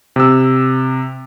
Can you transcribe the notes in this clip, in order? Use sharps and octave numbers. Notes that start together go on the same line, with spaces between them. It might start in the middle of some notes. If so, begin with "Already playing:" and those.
C3 E6